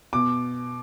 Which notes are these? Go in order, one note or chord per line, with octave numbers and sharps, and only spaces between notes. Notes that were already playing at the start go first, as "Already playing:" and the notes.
B2 D6